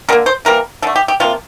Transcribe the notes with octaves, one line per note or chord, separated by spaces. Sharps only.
D3 G3 A#3 A#4
C5
E3 G3 A#3 A#4
D3 A3 A4
G4
G4
C3 F3 A#3 F4